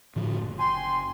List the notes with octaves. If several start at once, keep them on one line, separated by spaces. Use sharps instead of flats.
A2 D3 F3
F#1
G5 G#5 C6